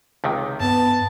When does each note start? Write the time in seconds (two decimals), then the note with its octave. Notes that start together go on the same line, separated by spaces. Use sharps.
0.24 C#2 C3 D#3
0.61 G2 B3 A5